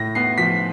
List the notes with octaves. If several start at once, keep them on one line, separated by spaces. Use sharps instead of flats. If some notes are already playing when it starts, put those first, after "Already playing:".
Already playing: A2 A#6
B3 C7
F3 B6